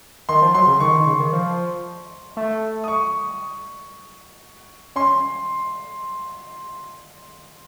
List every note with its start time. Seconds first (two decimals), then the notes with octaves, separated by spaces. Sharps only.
0.29 D#3 C6
0.42 F3
0.54 F#3 C6
0.67 C#3
0.80 D#3 C#6
0.94 D#3
1.07 C#3
1.20 D#3
1.33 F3
2.37 A3
2.84 D#6
2.88 C#6
4.96 C#4 C6